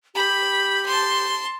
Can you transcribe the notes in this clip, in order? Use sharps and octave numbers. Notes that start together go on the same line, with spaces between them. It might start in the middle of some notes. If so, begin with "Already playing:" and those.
G4 B5
A5 C6